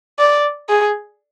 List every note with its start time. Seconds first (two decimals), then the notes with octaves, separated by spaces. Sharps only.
0.19 D5
0.69 G#4